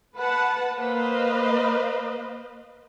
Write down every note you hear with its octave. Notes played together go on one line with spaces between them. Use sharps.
B4 F#5 A5
A#3 B4 C5 D#5 F5